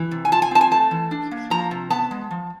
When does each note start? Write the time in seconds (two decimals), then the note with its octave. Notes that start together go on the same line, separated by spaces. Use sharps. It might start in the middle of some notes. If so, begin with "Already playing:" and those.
Already playing: E3
0.11 C3
0.25 G#5
0.32 F4 A5
0.42 G#5
0.51 C4 A5
0.61 G#5
0.71 A3 A5
0.91 E3
1.11 D4
1.31 A#3
1.50 F3 A#5
1.71 C3
1.90 B3 A5
2.11 G#3
2.31 F3